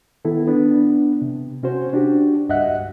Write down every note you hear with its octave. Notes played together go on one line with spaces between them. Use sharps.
D#3 B3 E4 A4
B3 D4
C3
C3 C#4 F#4 C5
D4 F#4 G4
C#2 G2 D#5 E5 F#5 F#6